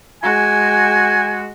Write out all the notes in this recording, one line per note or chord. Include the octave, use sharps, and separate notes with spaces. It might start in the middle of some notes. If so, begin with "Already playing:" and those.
G#3 F#4 G#5